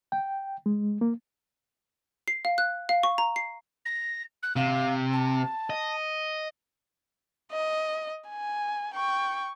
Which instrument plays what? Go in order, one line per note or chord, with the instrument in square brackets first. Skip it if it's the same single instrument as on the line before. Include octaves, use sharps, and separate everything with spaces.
[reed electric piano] G5
G#3
A#3
[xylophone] C7
F5
F#6
F5
C#6
A#5
C7
[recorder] A#6
F#6
[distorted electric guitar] C3 [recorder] F5
[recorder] A5
[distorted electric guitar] D#5
[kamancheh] D#5
G#5
G5 C#6